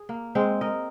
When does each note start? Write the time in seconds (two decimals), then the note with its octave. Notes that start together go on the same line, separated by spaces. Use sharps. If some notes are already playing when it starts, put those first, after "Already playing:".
Already playing: G#4
0.09 A#3
0.35 G#3 C4
0.61 A#4 D#5